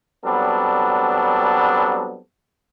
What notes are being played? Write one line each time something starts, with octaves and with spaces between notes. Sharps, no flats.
F#3 G3 B3 C4 D4 A4